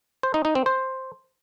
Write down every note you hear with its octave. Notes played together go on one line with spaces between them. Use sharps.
C5
D#4
D#4
C4
C5